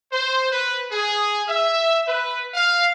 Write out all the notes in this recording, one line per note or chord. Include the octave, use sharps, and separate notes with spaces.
C5
B4
G#4
E5
B4
F5